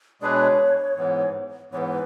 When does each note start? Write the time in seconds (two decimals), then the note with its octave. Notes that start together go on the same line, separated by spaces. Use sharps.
0.21 B2 G#3 D4 G#4 B4 C#5 D5
0.96 G#2 E3 B3
1.72 G#2 E3 B3 C#5
1.77 B4